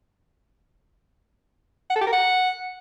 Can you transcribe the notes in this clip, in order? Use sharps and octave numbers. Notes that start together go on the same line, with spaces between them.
F#5
A4
G4
A#4
F#5